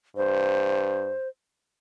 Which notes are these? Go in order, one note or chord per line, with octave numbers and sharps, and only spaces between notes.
G2 C5